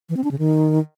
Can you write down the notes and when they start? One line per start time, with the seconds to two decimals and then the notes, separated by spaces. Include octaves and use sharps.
0.09 E3
0.17 C4
0.24 D4
0.31 C#3
0.39 D#3